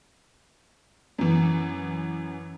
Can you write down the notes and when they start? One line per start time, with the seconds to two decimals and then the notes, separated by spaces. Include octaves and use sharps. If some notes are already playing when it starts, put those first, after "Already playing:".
1.18 F#2 E3